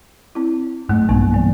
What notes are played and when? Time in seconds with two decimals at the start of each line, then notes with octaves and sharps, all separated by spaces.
0.35 C4 E4
0.89 G#2 F#3 A3
1.09 B1 G2 A#3 B3 D#4
1.32 E3 A#3 C4